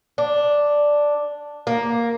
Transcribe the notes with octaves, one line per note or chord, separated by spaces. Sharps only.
D4
A#3